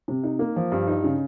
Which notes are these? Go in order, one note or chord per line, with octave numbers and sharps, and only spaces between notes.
C3
D#4
A#3
F3
G2
D#4
C#3